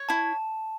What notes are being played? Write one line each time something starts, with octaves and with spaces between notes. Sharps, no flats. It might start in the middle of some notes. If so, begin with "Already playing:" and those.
Already playing: C#5
E4 A5